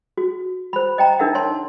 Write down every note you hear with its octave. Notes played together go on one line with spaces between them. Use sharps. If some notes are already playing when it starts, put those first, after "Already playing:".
F#4
C5 B5
D#5 G5 A#5
D4 D#4 A#4 E5 F#5
C#5 A5 C6